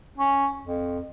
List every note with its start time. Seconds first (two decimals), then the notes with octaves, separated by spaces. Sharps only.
0.18 C#4
0.64 F2